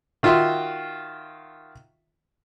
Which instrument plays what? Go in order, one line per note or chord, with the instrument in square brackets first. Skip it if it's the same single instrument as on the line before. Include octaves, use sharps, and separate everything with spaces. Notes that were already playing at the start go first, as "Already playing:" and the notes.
[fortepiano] D#3 F4 F#4 E5 C6